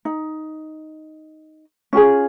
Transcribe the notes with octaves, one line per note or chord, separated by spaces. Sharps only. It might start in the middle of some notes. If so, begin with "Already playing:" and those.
D#4
C#4 F4 G4 G#4